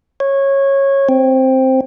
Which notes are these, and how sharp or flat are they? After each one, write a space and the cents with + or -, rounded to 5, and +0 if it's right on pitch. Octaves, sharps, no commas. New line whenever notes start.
C#5 -15
C4 +5